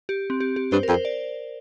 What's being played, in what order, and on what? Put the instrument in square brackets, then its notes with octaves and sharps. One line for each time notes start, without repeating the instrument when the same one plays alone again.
[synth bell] G4
C4
G4
G4
[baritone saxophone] G2 [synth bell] C5
[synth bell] A#4
[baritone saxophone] F2
[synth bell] C5
D5